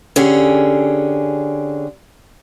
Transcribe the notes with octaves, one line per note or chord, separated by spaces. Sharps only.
D3 C#4 G4 G#4